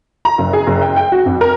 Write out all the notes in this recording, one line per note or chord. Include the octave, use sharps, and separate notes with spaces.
A#5
F#1
G#4
F#1
G5
G5
F#4
F2
A#4